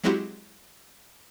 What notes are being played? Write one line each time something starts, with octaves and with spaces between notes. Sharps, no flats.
F#3 G#3 C4 E4 F#4 G4